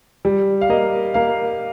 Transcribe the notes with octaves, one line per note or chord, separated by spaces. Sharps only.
G3
F5
A#3 D#5
A#3 F5